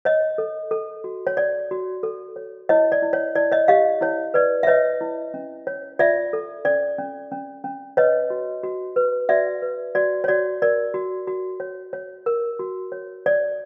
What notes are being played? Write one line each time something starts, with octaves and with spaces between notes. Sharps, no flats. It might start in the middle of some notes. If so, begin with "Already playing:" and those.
C#5 D#5
A4
A4
F#4
C#5
C#5 D5
F#4
A4
C#5
E4 C#5 D#5
D5
E4
C#5
E4 D5
C#5 D#5
G4 D#5 F5
E4 C#5
B4 D5
E5
B4 C#5 D#5
E4
C#4
C#5
F4 D5 E5
A4
C#4 D5
C#4
C#4
C#4
B4 C#5 D#5
F#4
F#4
B4
F#4 D5 E5
B4
F#4 D5
C#5
F#4 D5
A#4 D5
F#4
F#4
C#5
C#5
A#4
F#4
C#5
C#5 D5